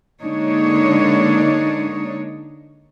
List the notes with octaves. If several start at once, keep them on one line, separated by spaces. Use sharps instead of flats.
D3 G#3 A#3 D4 D#4 C#5